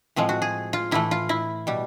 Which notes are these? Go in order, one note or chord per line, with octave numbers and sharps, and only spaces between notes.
A2 F3 G#3 C4
F#4
G#4
F4
A2 E3 A3 E4
F4
E4
B2 G3